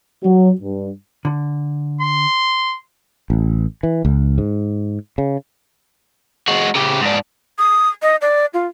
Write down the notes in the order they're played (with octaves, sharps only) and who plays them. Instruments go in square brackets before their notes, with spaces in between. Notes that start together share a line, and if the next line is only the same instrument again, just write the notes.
[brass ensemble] F#3
G2
[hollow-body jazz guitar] D3
[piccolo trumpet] C6
[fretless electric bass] A1
E3
C#2
G#2
C#3
[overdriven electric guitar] G#3 F#4
C#3 G4
G#2 D4
[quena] D#6
D#5
D5
F4